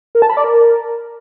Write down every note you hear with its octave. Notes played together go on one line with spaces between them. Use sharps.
A#4
A5
B5
D5
A#4